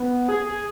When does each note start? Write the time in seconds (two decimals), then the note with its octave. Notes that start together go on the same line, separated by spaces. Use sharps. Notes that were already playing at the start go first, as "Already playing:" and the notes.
Already playing: B3
0.29 G#4
0.46 G#4